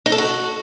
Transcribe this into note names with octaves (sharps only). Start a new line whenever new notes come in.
D#4
A4
F#4